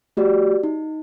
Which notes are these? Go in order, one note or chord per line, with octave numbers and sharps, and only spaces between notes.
A3 F#4 G4 D5
D#4